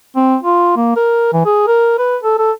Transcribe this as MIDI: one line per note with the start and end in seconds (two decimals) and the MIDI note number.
0.16 0.36 60
0.43 0.75 65
0.77 0.96 58
0.96 1.29 70
1.33 1.41 52
1.46 1.63 68
1.67 1.98 70
1.98 2.17 71
2.23 2.36 69
2.39 2.52 69